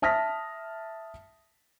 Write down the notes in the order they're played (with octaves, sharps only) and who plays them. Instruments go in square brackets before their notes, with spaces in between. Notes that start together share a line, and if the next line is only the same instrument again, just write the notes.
[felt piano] E5 A5 D#6 F6 A#6 B6